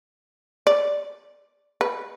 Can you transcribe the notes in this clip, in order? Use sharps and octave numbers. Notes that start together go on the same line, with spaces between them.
D5
B4